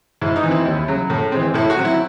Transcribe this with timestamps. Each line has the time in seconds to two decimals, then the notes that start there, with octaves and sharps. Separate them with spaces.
0.21 G#2 E4
0.36 D#4
0.43 E3
0.48 C4 E4
0.65 D#2
0.88 C#3 F#3
1.10 A2
1.32 E3 G#3 C4
1.54 A2 E4
1.70 F#4
1.77 F#3 C4
1.85 E4